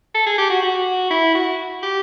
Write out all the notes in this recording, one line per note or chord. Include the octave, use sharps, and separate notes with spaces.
A4
G#4
G4
F#4
F#4
E4
F#4
G4